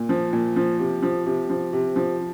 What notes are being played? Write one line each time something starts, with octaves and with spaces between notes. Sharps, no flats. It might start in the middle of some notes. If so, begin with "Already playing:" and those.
Already playing: A#2
F3
A#2
F3
C3
F3
C3
F3
C3
F3